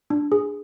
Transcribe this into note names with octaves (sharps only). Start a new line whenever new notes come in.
D4
G#4